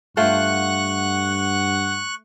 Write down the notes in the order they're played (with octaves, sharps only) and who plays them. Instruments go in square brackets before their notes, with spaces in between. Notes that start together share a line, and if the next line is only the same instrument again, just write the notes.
[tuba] G2 [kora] A3 F4 C5 [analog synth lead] F#5 [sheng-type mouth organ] C#6 F#6